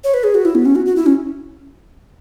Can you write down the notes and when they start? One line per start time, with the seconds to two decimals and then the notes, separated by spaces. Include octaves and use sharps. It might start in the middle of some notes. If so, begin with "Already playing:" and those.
0.04 C#5
0.14 B4
0.24 G#4
0.35 F#4
0.45 E4
0.55 B3
0.65 C#4
0.75 F#4
0.86 F#4
0.96 E4
1.06 C#4